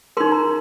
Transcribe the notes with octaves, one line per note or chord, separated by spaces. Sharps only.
D#4 A#4 C6
A#5